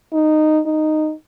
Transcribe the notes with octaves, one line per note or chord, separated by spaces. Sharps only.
D#4
D#4